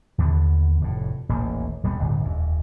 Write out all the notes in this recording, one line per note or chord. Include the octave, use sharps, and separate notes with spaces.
D#2 D3 B3
F1 A2
D#1 A1 A#3
D#1 G3 B3
D1 G1 C#2
D#1 F2